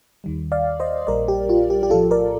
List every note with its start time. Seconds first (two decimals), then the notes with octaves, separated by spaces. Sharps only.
0.24 D#2 D#3 G3
0.52 D5 F5
0.80 C5 D#5
1.07 A#1 A#2 G3 A#4 D5
1.28 G4
1.49 F4
1.70 G4
1.83 G4
1.90 A#1 A2 F3 F4 A4
2.11 A#4 D5